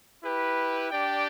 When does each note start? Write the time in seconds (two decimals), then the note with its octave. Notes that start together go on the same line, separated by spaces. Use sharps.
0.22 E4 G4 B4
0.90 D4 G4 D5 G5